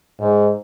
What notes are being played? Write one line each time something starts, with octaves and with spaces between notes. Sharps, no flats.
G#2